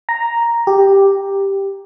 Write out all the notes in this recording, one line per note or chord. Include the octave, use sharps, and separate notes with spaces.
A#5
G4